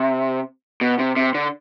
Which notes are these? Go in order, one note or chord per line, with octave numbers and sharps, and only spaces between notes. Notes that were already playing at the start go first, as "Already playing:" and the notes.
Already playing: C3
B2
C3
C3
D3